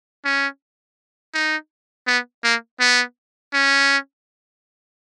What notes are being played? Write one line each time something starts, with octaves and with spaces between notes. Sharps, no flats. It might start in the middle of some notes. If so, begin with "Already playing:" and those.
C#4
D#4
B3
A#3
B3
C#4